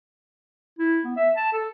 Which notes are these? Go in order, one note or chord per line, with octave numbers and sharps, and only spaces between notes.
E4
B3
E5
A5
A4